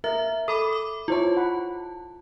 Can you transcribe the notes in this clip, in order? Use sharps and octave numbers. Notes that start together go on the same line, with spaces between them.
A#4 E5
A4 B5 D6 D#6
D6
E4 F4 C5 C#5 A5
F#5 B5